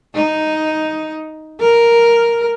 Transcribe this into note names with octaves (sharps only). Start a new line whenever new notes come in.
D#4
A#4